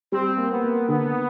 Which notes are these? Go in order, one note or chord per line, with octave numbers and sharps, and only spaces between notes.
G3 C4
A#3
B3
A#3
D3 B3